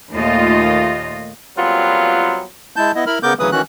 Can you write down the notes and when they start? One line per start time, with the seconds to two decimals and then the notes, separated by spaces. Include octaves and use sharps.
0.12 D#2 A#2 A3 F4 D#5
1.58 A#2 F#3 G3 B3 C4 F4
2.76 G#3 E4 A5 G6
2.95 B3 E4 D#5
3.07 E4 A#4 B5 F6
3.23 C#3 B3 A#4 D6 G6
3.39 D2 C#3 E3 F#3 B4 D#6
3.52 D#3 E3 C#4 F#4 F#6